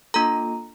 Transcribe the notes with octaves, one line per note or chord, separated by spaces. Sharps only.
A#3 D4 F4 A4 A#5